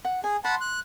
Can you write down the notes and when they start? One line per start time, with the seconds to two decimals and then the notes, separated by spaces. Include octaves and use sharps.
0.05 F#5
0.24 G#4 G#5
0.44 F#5 A5 B5 C6
0.61 F#6